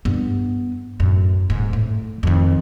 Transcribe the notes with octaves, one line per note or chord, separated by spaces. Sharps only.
G2 B3
F#2 A2
D#1 G#2
A2
F2 D#3